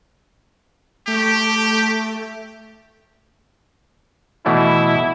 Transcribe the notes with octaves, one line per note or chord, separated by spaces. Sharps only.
A3 G4
B2 E3 A3 E4